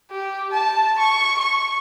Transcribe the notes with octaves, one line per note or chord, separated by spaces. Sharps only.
G4
A5
C#6
C#6